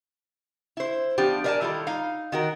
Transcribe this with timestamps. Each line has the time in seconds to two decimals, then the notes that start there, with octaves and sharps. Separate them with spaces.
0.77 E4 C5
1.18 F3 B3 D4 G4
1.44 A#4 B4 D5 E5 G#5 A5
1.61 D#3 G3 E4 F4 A4
1.87 D#4 F5
2.32 D#3 F#4 A#4